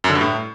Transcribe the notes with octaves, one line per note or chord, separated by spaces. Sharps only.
F#2
D3
G2
A2